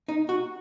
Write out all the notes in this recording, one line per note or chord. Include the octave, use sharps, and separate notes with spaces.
D#4
F#4